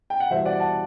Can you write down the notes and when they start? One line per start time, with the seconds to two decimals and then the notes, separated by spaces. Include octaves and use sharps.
0.10 G5
0.20 F#5
0.31 E2 B2 G3 C5 E5
0.46 D5 F#5
0.60 F#5 A5